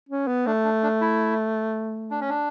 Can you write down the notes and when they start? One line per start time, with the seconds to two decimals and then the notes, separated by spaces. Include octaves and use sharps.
0.09 C#4
0.28 B3
0.46 A3 D4
0.64 D4
0.83 D4
1.01 E4
2.11 D4
2.21 C#4
2.29 D4